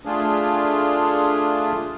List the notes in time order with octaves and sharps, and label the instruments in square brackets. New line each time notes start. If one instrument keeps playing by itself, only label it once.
[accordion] A3 D4 F4 G#4